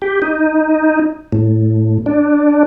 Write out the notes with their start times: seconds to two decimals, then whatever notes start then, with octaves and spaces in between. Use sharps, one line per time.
0.02 G4
0.22 D#4
1.32 A2
2.06 D4